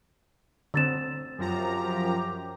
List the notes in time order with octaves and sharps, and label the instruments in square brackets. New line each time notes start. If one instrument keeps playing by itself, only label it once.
[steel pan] D3 C4 [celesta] E6 A6 E7
[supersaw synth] F#2 F3 A#5 [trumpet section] G4